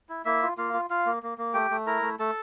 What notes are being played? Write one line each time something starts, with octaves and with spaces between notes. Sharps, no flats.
E4
A#3 E4 E5
F4
A#3 F4 F5
F4
F4 F5
A#3
A#3
A#3
A3 G4 G5
A3
E4 A#4 A#5
A3
A3 A4 A5